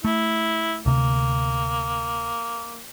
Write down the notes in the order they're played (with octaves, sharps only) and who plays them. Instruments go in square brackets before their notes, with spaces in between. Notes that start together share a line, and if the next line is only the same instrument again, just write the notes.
[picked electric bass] A3 [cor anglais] E4
[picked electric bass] D2 C3 [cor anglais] A#3